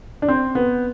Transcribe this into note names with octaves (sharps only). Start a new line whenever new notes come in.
D4
C4
B3